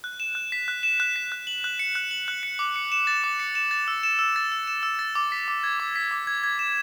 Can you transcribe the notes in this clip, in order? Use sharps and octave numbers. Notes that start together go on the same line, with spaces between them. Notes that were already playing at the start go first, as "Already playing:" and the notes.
F#6
E7
F#6
B6
F#6
E7
F#6
B6
F#6
F#7
F#6
C#7
F#6
F#7
F#6
C#7
D6
C#7
E7
A6
D6
C#7
E7
A6
E6
E7
E6
A6
E6
E7
E6
A6
D6
B6
D6
G#6
D6
B6
D6
G#6
G#6
E7